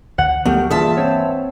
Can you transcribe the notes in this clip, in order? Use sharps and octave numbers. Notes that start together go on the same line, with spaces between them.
D2 F#5
D2 F3 F#3 A3 B3 G4 A#4
G2 E3 A#3 F4 G#4 E5 A5
C4 C5 C#5